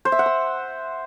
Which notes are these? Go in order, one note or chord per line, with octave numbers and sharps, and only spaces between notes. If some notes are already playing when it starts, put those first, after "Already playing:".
C5
E5
F#5
E6